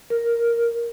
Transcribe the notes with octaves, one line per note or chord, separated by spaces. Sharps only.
A#4